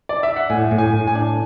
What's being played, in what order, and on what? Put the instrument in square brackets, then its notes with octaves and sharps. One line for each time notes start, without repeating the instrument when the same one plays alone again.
[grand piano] D5
E5
F#5
[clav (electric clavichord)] A2 [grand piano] G#5
[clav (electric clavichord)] A2
[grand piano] G#5
[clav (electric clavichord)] A2
[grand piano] G#5
[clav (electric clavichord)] D4